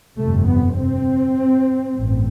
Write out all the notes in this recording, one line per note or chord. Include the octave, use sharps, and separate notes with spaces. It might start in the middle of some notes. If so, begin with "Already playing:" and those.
G1 F2 C3 A3
B3
C4
A1 G2